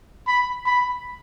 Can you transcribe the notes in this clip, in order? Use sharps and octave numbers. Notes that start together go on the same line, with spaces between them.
B5
B5